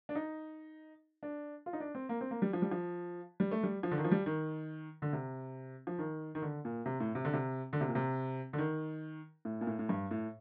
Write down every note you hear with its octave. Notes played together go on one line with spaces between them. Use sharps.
D4
D#4
D4
F4
D#4
D4
C4
A#3
C4
A#3
G3
F3
G3
F3
G3
A3
G3
F3
D3
D#3
F3
G3
D#3
D3
C3
F3
D#3
D#3
D3
A#2
C3
A2
C3
D3
C3
D3
C3
A#2
C3
D3
D#3
A2
A#2
A2
A2
G2
A2